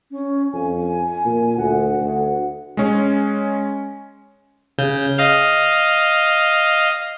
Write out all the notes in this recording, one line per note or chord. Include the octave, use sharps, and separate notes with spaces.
C#4
F2 G#5
A#2
D2 F#5
D2
G#3 C#4
C#3 G6
D#5 F5 F6